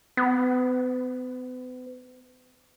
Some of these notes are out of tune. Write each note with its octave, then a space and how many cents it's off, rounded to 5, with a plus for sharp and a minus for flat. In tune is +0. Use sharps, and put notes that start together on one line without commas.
B3 +40